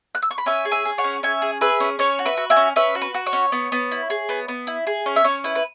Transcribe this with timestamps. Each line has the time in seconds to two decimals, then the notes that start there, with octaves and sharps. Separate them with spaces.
0.15 F#6
0.22 E6
0.31 C#6
0.38 B5
0.46 C#4 E5 G#5
0.65 G#4
0.71 E5 G#5
0.85 G#4
0.98 C#5 F#5
1.04 C#4
1.23 C#4 E5 G#5
1.42 G#4
1.61 G#4 B4 E5
1.80 C#4
1.99 C#4 C#5
2.19 F#4
2.26 B4 E5
2.37 F#4
2.50 E5 G#5
2.56 C#4
2.76 C#4 B4 E5
2.95 F#4
3.01 B4
3.14 F#4
3.26 C#5
3.33 C#4
3.52 B3
3.72 B3
3.91 E4
4.10 G#4
4.29 B3
4.48 B3
4.67 E4
4.87 G#4
5.06 C#4
5.16 E5
5.24 C#4 C#5
5.44 E4 B4
5.56 B4